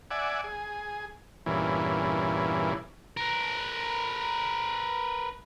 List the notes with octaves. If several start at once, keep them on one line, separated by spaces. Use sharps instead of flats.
D5 E5 F#5 G#5
G#4
E2 G2 A#2 C#3 E3
A#4 B4